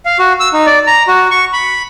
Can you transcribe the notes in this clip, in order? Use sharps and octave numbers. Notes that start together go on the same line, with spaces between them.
F5
F#4
E6
D#4
D5
A#5
F#4
C#6
B5